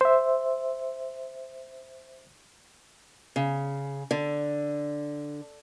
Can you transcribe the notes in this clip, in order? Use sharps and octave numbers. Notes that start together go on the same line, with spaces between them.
C5 E5
C#3
D3